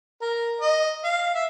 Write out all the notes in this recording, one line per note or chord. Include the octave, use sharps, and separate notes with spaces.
A#4
D#5
F5
E5